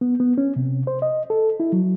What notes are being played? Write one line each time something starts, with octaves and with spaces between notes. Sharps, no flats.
B3
B3
C#4
C3
C5
D#5
A4
E4
F#3